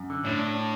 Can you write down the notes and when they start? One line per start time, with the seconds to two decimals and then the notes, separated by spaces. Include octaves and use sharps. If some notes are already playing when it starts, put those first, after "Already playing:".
Already playing: F#2
0.10 D3
0.24 A2 D4
0.39 D4
0.55 D4